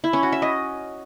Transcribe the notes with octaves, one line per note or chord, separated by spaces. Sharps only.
E4
C#4
F#4
E5
D#5